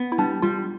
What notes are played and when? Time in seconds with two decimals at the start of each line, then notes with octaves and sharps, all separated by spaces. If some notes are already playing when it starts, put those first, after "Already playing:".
Already playing: B3
0.12 E4
0.18 G3 D4
0.42 G3 F4